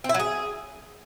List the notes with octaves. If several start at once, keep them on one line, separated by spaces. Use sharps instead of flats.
C4
E4
F#3
G#4